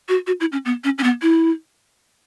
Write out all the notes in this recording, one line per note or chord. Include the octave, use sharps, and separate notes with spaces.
F#4
F#4
E4
C#4
B3
C#4
C#4
B3
E4